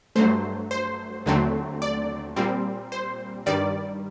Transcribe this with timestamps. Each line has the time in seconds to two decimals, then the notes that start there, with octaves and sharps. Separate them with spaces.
0.16 G2 F#3 A3 C5
0.71 C5
1.26 D#2 D3 F#3 A3 C4
1.82 D5
2.36 A#2 G3 C4
2.92 C5
3.46 G2 D#3 G3 D5